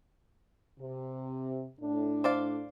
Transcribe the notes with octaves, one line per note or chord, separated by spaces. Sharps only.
C3
A2 D4
C5 D5 F5